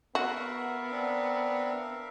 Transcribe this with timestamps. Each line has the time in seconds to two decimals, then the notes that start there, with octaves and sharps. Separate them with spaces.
0.15 B3 F#4 A#4 E5 F5
0.91 C4 D4